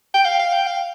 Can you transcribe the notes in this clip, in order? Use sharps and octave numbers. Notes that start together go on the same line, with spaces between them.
G5
F5
F5
G5
F5